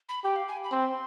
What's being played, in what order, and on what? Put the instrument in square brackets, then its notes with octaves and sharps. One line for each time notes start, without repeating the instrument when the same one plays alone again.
[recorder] B5
[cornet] G4 [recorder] G5
[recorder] F5
G#5
B5
[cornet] C4 [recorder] C6